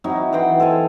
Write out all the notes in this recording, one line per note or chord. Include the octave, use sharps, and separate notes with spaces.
F#3 C4 D#4 E4
E3 F#5 G5 C6
A4 C5 F5 G#5